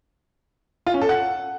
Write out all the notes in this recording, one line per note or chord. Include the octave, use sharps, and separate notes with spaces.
F4
C#4
A4
F#5